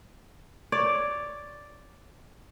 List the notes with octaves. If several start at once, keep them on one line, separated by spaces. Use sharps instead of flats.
C#5 D5